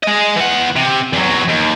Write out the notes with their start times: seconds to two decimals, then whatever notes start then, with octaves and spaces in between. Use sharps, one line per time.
0.03 G#3 D#5
0.36 E3 F#5
0.76 C3
1.13 E2 F#3
1.49 D#2